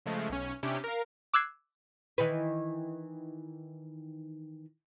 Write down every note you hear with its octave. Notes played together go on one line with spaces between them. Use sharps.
C#3 F3 G#3 A3
B1 C#4
C3 C#4 D4 E4 G4
A#4 F5
D6 E6 F#6 G#6 C7
D#3 E3 B4